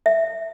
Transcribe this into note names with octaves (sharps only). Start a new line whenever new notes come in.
E5